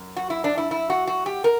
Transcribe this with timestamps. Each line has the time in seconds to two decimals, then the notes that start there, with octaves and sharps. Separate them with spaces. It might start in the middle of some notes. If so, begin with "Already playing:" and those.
Already playing: F#2
0.16 F#4
0.30 E4
0.44 D4
0.57 E4
0.71 E4
0.90 F#4
1.07 F#4
1.26 G4
1.44 A#4